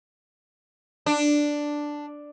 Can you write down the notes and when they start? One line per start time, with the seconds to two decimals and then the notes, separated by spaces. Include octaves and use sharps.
1.06 D4